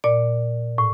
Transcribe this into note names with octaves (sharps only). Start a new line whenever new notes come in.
A#2 D5
A2